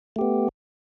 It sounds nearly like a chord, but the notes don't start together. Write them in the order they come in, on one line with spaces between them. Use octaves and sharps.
A3 G4 B3